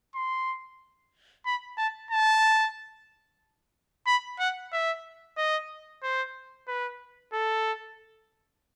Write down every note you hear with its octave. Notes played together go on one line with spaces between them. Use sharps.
C6
B5
A5
A5
B5
F#5
E5
D#5
C5
B4
A4